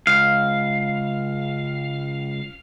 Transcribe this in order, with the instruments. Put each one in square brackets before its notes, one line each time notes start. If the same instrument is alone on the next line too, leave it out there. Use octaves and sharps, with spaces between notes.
[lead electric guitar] C#2 [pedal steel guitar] F5